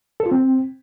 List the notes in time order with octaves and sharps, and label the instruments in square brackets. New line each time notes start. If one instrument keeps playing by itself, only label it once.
[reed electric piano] A4
F4
C4